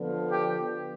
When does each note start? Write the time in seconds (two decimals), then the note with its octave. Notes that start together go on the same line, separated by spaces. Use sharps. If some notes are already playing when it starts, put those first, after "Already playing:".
Already playing: D3 F3 B3
0.32 G4